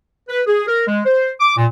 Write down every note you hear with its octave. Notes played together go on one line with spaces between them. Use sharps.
B4
G#4
A#4
G#3
C5
D6
A#2